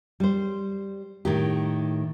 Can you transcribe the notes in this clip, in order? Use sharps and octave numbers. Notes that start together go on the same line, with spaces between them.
G3 C5
A2 D#3 G4